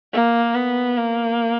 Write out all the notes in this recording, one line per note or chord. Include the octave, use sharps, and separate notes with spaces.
A#3
B3
A#3